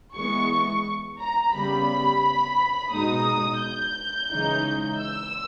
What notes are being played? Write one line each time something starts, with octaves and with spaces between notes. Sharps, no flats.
E3 G#3 B3 C#6
A#5
C#3 G3 B3 B5
B2 G#3 D#4 D#6
G6
C#3 E3 G#3 D#4
E6